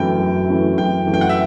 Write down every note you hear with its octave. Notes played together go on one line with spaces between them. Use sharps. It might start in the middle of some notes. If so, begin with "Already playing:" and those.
Already playing: F#2 E3 A3 C#4 E4 G5
F#2
E3 A3 C#4 E4
F#2 G5
E3 A3 C#4 E4
G5
F#5
E5